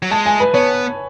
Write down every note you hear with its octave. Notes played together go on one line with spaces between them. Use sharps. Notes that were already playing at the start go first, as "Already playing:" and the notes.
F#3
G#3 A5
G#5
B4
B3 C#5